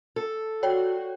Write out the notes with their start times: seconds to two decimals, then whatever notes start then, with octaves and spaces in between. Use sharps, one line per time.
0.16 A4
0.63 F#4 C#5 D5 G5